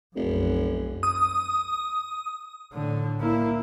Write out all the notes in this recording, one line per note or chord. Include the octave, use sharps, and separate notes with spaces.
F1 B1 F#2
D#6
A2 D3
A#3 E4